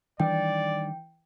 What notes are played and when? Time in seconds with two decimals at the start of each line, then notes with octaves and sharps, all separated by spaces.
0.20 D#3 E3 G3 D4 D5 G5